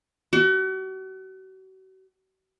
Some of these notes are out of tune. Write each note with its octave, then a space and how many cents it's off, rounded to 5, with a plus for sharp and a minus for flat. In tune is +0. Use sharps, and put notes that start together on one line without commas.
F#4 +40